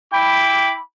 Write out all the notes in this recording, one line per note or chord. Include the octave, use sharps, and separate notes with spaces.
E4 G5 B5 D6